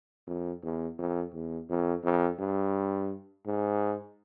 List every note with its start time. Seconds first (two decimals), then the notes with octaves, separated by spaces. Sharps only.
0.27 F2
0.63 E2
0.98 F2
1.34 E2
1.69 F2
2.04 F2
2.39 G2
3.46 G#2